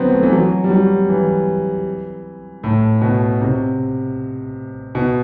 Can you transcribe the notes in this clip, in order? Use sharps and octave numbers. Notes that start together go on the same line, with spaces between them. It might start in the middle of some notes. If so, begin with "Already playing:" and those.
Already playing: B2 D3 F#3 B3 C4
A3
E3
F#3
G3
F#3
E3
A2
B2
C3
B2